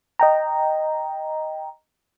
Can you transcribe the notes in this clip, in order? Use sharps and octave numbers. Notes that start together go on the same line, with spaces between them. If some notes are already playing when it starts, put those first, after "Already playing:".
D#5 G5 A#5